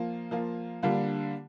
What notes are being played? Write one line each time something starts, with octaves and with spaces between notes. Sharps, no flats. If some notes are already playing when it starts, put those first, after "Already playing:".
Already playing: F3 A#3 F4
F3 A#3 F4
D3 G3 A#3 D4 F4